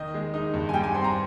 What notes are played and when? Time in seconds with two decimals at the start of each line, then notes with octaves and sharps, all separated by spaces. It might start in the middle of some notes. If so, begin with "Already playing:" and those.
Already playing: D#3 D#5
0.14 G#3
0.34 D#4 D#5
0.54 G2
0.69 G#5
0.74 G3 G5
0.83 G#5
0.94 C4 C6
1.04 A#5